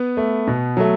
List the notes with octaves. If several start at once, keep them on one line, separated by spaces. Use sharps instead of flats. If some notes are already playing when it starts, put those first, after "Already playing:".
Already playing: B3 B4
A3
B2
F#3 A3